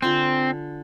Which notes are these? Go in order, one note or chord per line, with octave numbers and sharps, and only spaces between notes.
D3 C4 F4 G#5